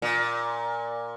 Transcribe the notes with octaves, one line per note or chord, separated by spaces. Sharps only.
A#2